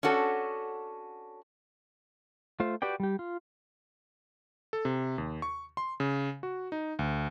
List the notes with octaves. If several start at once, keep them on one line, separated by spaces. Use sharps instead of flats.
C#4 D4 F#4 A4
A3 F4 C5
F#4 G4 B4 D5 G5
G3 G4
F4
A4
C3
D#2
C#6
C6
C#3
F#4
D#4
D2